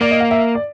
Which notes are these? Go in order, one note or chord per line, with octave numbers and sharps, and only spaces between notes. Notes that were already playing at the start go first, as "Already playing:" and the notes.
A#3 D5
D#5
F5
E5
D5